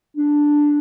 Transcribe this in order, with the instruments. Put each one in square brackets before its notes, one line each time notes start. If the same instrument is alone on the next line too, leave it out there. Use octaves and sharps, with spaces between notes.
[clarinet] D4